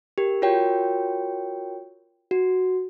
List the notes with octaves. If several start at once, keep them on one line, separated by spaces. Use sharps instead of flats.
G4 A#4
F4 F#4 A#4 C#5 G5
F#4